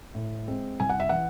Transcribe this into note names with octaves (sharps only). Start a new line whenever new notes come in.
A2
G#3 C4
C2 G#5
F#5
E5
E3 F#5